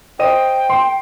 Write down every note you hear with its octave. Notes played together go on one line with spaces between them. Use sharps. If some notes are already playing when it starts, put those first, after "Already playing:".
C5 D#5 G5 D#7
C6